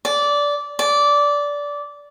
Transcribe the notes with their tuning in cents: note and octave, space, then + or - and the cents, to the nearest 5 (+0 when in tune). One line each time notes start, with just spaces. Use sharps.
D5 -15
D5 -15